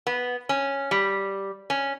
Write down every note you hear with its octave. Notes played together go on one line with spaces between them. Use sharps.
B3
C#4
G3
C#4